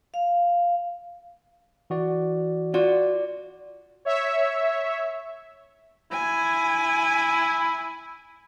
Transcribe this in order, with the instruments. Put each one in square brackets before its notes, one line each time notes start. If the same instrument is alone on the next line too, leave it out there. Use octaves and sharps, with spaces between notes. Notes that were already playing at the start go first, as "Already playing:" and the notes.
[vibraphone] F5
[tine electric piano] E3 F#4 D5
[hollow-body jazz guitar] F4 F#4 [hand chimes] D5
[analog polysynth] C#5 E5
[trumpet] E4 [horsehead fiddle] G#5